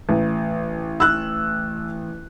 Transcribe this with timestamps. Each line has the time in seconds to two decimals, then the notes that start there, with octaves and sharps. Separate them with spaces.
0.09 A1
1.00 E6 F#6